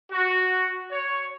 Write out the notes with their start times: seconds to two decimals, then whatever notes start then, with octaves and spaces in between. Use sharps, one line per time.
0.12 F#4
0.92 C#5